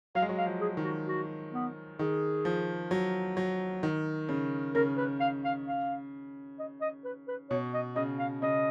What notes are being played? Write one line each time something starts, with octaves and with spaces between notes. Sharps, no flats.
F#3 F5
G#3
F#3
F5
F3
G#4
D#3
F#4
F#4
B3
D#3 G#4
F3
F#3
F#3
D#3
C#3
C#3 A#4
B4
F5
F5
F5
D#5
D#5
B4
B4
B2 C#5
D#5
C#3 D#5
F5
C#3 D#5